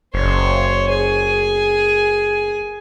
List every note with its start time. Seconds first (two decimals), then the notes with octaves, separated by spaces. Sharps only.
0.14 F#1 C5 C#5
0.89 G#4 G#5